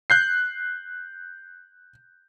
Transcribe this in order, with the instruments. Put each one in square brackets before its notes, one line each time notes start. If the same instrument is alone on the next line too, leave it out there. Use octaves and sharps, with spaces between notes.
[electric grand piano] F#6 G6 C7